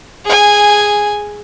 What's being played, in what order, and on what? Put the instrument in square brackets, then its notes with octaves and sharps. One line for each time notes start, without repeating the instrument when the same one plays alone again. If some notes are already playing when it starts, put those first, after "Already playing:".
[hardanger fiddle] G#4 G#5